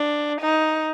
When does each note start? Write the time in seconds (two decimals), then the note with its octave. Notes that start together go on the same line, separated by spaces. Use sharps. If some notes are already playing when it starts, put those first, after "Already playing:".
Already playing: D4
0.41 D#4